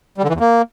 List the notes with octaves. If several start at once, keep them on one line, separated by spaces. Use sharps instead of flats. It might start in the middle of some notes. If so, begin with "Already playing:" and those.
G3
D3
E3
E2
A#3